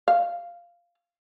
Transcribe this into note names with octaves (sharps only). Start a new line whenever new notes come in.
F5